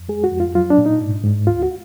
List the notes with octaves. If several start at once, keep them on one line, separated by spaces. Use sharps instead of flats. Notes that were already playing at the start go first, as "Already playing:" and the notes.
Already playing: F2
G#3 G#4
F#4
F2
F4
F#3 F4
D4
A#2
D#4
G#2
G#2
D2 F4
F#4